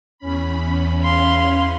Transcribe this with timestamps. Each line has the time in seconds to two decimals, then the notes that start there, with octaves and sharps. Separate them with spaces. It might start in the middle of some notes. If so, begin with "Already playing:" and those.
0.18 E2 C#4 B5
1.04 F5 C6